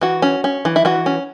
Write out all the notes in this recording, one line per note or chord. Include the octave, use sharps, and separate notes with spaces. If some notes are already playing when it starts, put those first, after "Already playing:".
E3 F#4
C#4
C#4
E3
E4
E3 F#4
C#4